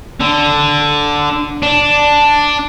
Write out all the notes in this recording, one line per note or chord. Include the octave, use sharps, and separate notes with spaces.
D3
D4